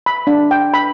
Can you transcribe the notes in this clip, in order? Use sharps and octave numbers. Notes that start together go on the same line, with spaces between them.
B5
D4
G5
B5